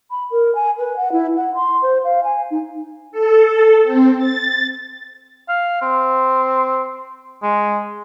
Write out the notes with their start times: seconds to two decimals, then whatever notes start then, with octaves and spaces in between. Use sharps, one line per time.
0.11 B5
0.31 A#4
0.55 G#5
0.79 B4
0.97 F#5
1.12 E4
1.36 F#5
1.55 C6
1.83 C5
2.04 F5
2.24 G#5
2.51 D#4
3.12 A4
3.83 C4
4.17 A6
5.49 F5
5.82 C4
7.43 G#3